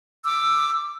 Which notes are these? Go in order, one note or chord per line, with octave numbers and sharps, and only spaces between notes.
D6 E6